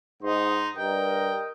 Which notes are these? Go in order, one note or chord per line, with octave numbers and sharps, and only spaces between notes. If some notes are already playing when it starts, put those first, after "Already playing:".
G#2 D#4 D#5 F#5 C6
G2 A#4 D#5 G5